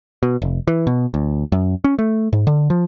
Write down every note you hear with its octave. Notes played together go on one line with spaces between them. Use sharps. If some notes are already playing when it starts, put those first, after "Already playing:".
B2
F1
E3
B2
D2
F#2
C#4
A3
G#2
D3
F3